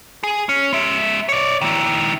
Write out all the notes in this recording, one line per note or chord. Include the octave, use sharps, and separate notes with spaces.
G#4
C#4
G#3 E5
C#5 D5
D#3 E4